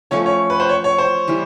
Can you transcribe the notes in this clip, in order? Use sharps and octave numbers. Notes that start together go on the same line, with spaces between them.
F3 A3 C#4 C#5
C#5
B4
C5
C#5
C#5
C5
E3 G3